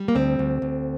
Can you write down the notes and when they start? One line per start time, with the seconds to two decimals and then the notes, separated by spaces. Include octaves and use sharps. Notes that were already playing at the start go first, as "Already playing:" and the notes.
Already playing: G3
0.08 A#3
0.15 D2 C4
0.39 D2
0.62 D2